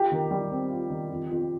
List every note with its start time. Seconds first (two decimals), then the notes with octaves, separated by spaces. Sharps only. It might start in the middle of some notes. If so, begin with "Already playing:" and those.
Already playing: F4 G4
0.12 D#3
0.31 G3
0.52 C4
0.70 F4
0.90 D#3
1.10 F2
1.30 F2